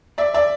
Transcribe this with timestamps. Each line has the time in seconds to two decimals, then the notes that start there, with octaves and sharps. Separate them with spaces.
0.18 D5 E5
0.34 D5 E5